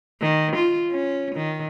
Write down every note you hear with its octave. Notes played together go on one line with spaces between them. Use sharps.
D#3
F4
C#4
D#3